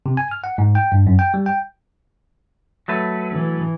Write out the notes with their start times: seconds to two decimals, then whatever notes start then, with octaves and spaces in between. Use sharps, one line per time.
0.06 C3
0.17 G#5
0.31 F6
0.44 F#5
0.58 G#2
0.75 G5
0.92 G2
1.07 F#2
1.19 G5
1.34 G3
1.46 G5
2.88 F#3 A3 B4
3.32 E3